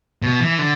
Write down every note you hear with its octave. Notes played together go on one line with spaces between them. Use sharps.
B2
E3
D3